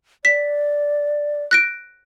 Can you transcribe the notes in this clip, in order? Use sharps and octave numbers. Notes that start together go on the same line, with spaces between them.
D5 B6
F#6 A#6 D7